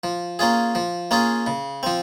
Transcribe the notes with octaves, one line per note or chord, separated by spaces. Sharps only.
F3
A#3 C#4 F4 G#4
F3
A#3 C#4 F4 G#4
C#3
F3 C4